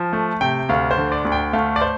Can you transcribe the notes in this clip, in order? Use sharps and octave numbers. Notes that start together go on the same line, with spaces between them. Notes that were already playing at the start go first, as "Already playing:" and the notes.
Already playing: F3
A3
C3 G5
D2 F5
C5
D3
D5
D2
G5
A3 F5
D5
C5